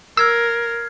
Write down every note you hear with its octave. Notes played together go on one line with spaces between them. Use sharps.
A#4 E6 F6 G#6 C7